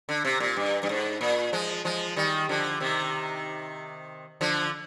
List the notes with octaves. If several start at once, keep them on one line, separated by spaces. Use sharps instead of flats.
D3
C3
A#2
G2
G2
G#2
A#2
F3 G#3
F3 G#3
D#3 G3
D3 F3
C3 D#3
D3 F3